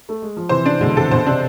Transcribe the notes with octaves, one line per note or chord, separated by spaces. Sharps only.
A3
G#3
F3
C3 E3 C5
D4
B2 D3 G#3
C3 E3 A4
B2 D3 C5
C3 D4